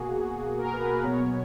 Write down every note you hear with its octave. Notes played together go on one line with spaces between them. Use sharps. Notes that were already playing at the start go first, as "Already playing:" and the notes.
Already playing: B2 A#3 F#4 G#4
A#4
B4
B4
B2 F#3 B3 C#5